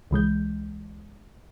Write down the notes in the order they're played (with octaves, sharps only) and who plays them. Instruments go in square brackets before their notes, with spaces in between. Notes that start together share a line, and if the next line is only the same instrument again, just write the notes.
[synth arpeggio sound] C#2 E3 G#3 G6